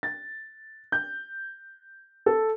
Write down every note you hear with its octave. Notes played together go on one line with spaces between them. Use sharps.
A6
G6
A4